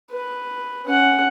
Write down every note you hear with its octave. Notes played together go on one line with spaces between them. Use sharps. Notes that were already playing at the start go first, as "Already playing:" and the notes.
B4
C#4 F#5